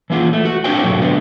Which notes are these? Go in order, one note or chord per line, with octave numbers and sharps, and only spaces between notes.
E3 A#3 F4
A3
F#4
A#3 C4 D4 F#4 C5 G5
G#2 B2 D3 F#3 F#4
D3 A3 B3